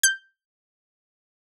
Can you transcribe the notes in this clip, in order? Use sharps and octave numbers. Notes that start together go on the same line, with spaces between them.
G6